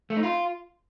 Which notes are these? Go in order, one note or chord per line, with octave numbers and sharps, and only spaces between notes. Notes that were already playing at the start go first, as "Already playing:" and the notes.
A3
D#4
F4